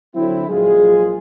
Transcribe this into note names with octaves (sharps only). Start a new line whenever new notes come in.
D3 F#3 C4 E4
A#1 F#3 G#3 F4 G#4